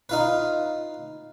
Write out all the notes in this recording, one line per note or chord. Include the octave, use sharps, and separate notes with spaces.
D#4 F4 B4